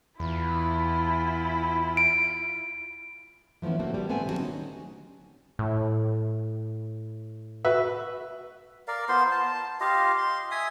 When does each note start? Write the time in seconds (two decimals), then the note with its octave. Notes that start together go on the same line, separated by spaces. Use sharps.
0.20 E2 E4 F4 B5
1.97 D7
3.62 E3 F3 A3 B3 C#4
3.79 A2 D3 A3 A#3 C4 F#4
3.94 G3 B3
4.09 A3 B3 C4 A4 G#5
4.26 D3 D#3 F#3 D4 F#4 G4
4.39 C#4 D#4
5.59 A2
7.65 F#4 B4 E5
8.88 A#4 D5 F5
9.09 B3 F4 C5 C6
9.32 A5
9.81 F4 G4 D#5 F5
10.18 C6
10.51 E5 G#5 D#6